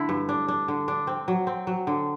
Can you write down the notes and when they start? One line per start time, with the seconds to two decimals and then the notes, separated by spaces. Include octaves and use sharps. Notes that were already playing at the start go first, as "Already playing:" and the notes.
Already playing: D3 A3 E4
0.09 G2
0.29 D4
0.48 D4
0.68 D3
0.88 D4
1.07 C4
1.28 F#3
1.47 C4
1.67 F#3
1.87 D3